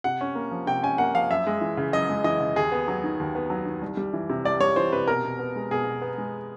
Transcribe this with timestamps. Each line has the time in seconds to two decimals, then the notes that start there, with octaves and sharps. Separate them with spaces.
0.04 C3 F#5
0.21 C#4
0.35 A#3
0.51 F3
0.67 C3 G5
0.83 C#4 G#5
0.98 A#3 F#5
1.14 F3 F5
1.30 F#2 E5
1.47 G#3
1.61 E3
1.77 C#3
1.93 F#2 D#5
2.09 G#3
2.24 E3 D#5
2.40 C#3
2.56 D#2 G#4
2.72 B3
2.88 F#3
3.04 D#3
3.20 D#2
3.35 B3
3.50 F#3
3.66 D#3
3.81 C2
3.97 G3
4.13 E3
4.29 C3
4.44 C2 D5
4.60 G3 C#5
4.76 E3 C5
4.93 C3 B4
5.07 B2 A#4
5.24 B2
5.39 B3
5.56 G#3
5.71 B2 G#4
5.86 B2
6.02 B3
6.18 G#3